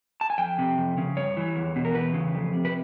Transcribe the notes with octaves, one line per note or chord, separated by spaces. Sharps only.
A5
G#5
F2 G5
C3
F2
C#3
G2 C#5
E3
E2
B2
A#4
E2 B4
C#3
F2
C3
B4